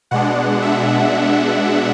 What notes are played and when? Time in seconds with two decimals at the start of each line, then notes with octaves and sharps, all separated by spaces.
0.11 B2 G#3 D4 F#5
0.62 E5